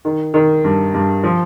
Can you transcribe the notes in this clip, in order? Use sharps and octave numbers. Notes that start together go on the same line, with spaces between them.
D#3
D#3
G2
G2
F3